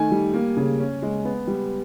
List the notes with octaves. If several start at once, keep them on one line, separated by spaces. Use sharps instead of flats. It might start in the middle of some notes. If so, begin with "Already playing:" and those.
Already playing: D#3 A3 G#5
G3
A#3
C#3
C#4
G#3
B3
G3